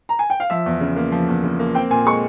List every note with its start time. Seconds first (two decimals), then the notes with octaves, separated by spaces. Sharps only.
0.09 A#5
0.19 G#5
0.30 G5
0.40 F5
0.50 F3 E5
0.66 E2
0.81 C#3
0.96 A#3
1.12 F3
1.28 E2
1.43 C#3
1.59 A#3
1.74 C4 G5
1.90 A#2 G#5
2.06 G#3 C#6